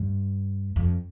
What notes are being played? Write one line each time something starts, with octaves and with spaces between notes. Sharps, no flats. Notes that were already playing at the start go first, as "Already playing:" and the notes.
Already playing: G2
F2